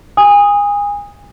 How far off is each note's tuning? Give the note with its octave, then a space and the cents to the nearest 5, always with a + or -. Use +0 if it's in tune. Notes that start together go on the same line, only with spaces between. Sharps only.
G#5 -30 D#6 +5